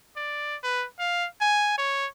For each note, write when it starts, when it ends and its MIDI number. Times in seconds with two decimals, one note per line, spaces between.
0.16 0.56 74
0.63 0.86 71
0.99 1.27 77
1.41 1.73 80
1.78 2.07 73